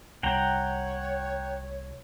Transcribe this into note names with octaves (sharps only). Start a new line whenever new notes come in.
C2 C#5 F#5 G5 A#5